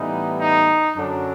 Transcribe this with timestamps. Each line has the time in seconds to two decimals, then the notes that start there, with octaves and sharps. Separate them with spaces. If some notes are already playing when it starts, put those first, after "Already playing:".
Already playing: A2 E3 G3 B3 D#4
0.37 D#4
0.95 F#2 D3 F#3 D4